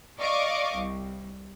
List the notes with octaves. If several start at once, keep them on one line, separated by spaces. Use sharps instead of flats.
D5 D#5 F5 C#6 D6
C2